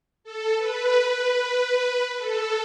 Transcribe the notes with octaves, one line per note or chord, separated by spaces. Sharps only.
A4
B4
A4